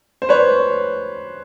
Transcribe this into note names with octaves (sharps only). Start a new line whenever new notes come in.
C5
B4 C#5